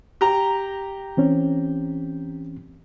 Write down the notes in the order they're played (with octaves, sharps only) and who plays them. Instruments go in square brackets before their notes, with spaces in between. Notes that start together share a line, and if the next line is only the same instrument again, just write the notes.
[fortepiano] G4 A#5
[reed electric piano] E3 C4 C#4